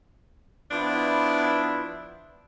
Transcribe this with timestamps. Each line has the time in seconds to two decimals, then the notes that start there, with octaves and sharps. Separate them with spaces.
0.71 F3 B3 D4 E4